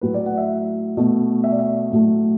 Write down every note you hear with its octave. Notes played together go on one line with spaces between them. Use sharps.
A2 F#3 A3 B4
D5
F#5
E5
B2 A3
E5
D5
E5
A2 F#3 A3